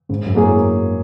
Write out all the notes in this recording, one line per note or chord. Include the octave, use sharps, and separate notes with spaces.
G#2 C#3
F#2
F#3 A#3 E4 G#4